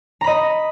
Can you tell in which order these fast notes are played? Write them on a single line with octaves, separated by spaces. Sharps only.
A#5 B5 D#5